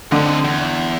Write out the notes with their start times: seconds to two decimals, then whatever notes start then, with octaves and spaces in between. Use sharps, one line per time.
0.12 D3 C4 D#5
0.45 E2